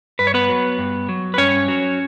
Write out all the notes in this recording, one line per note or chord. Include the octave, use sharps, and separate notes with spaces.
G2 B4
C#5
B3 B4
F#3
G2
F#3
B4
G2 C#4 C#5
F#3